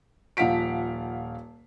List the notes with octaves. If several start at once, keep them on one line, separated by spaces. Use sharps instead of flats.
D#1 F3 F5 F#5 B6 D7